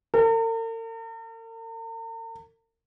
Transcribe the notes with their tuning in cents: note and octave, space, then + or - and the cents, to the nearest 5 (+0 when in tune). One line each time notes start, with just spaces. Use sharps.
A#4 -45